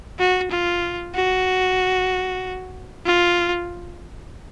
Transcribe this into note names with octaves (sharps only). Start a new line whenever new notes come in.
F#4
F4
F#4
F4